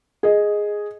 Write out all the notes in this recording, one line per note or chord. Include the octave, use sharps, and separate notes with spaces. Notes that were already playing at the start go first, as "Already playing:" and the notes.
G#4 D#5